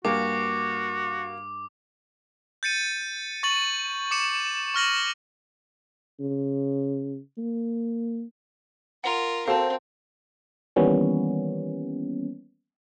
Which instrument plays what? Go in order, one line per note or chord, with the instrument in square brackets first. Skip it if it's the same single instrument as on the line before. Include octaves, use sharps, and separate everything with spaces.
[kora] G2 [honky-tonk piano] A#3 [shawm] F#4 [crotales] D6
[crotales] G6 A6 C#7 D#7
C#6 A6 F#7
D6 C#7 E7
C#6 F6 A#6 F#7
[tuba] C#3
A#3
[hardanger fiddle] F4 A#4 [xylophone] F#5 A#5
[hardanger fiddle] C4 [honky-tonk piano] F#4 A4 C5 [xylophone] F5 A5
[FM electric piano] D#3 E3 G3 A#3 B3 C#4